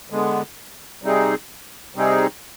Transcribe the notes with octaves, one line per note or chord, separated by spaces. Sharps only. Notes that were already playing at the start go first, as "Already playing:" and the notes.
D3 G#3 B3
C3 G3 C4 D#4 G#4
C3 G3 C4 D#4 G#4